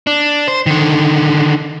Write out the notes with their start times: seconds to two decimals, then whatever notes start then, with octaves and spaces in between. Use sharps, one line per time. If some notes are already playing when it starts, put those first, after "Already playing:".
0.07 D4
0.48 C5
0.66 D3 D#3